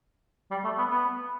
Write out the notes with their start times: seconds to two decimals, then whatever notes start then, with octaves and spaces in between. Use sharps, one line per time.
0.51 G3
0.64 A3
0.78 B3
0.91 B3